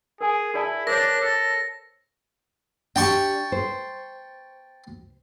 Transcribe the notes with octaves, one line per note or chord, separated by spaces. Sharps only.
G#4 A#4 G#5
E4 G#4 D5 A5
D4 A#4 C5 C#5 A#6
A4
D4 G4 G5 A5 C#6
C5